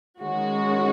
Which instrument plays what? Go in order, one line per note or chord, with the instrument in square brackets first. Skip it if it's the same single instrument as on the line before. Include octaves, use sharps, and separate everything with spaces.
[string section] D#3 G#3 C#4 F#4